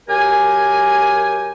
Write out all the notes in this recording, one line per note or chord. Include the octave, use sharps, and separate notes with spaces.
F#2 G4 A#4 G#5